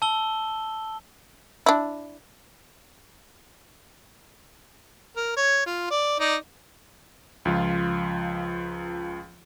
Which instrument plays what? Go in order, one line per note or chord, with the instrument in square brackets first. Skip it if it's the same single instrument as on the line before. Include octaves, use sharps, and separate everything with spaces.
[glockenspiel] A5 E6 G7
[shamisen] D4 E4
[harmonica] A#4
C#5
F4
D5
D#4 D5
[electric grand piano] C#2 F3 F4